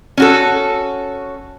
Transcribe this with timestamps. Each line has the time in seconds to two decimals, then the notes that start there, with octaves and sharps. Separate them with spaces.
0.17 C#4 F#4 A4